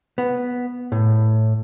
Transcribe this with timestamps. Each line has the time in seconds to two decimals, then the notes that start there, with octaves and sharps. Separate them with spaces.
0.18 B3
0.92 A2